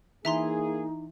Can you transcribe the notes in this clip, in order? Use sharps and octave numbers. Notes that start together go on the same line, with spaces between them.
E3 A#3 D#4 G#4 E5 A#5 C6